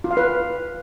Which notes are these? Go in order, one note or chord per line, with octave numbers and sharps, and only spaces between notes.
F4
F5
B4